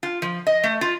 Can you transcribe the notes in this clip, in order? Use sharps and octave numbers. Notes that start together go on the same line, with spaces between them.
F4
F3
D#5
A3
F4